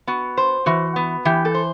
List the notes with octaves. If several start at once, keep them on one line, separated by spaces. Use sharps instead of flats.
B3 F#4
C5
E3 F#4
B3
E3 G4
A4
C5